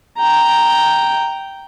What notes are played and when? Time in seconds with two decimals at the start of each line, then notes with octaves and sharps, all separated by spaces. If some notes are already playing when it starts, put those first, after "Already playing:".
0.17 G5 A#5